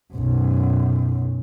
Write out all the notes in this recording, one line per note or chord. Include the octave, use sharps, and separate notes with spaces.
B1 F#2